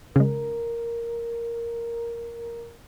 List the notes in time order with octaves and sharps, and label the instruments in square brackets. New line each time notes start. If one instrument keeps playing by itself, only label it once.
[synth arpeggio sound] C#3 G#3 [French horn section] A#4